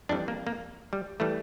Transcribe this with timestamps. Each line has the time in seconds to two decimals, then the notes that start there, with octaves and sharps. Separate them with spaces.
0.09 F2 E3 G3 D4
0.28 A#3
0.47 A#3
0.93 G3
1.20 E3 G3 A3